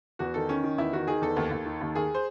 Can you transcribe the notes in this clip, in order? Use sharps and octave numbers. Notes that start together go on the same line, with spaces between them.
E2 F#4
D#3 A4
D#3 C#4
D#3
E2 E4
D#3 F#4
D#3 G#4
E2 A4
D#2
D#2
D#3
D#2
D#2 G#4
C5